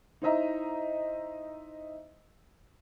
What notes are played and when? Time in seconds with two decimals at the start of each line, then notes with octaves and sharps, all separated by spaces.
0.22 D#4 E4 C5 D#5 E5 A#5